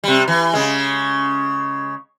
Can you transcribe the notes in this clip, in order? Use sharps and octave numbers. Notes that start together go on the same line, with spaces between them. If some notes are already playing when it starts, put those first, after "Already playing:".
C3 G3
E3
C#3 G#3